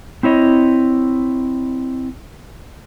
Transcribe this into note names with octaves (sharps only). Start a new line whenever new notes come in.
C4 E4 C#5 D#5